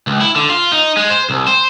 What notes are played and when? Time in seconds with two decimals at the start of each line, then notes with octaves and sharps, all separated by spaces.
0.07 C#2
0.21 E4
0.36 D3
0.50 F4
0.72 D#4
0.97 G#3
1.10 C5
1.30 C2
1.47 C5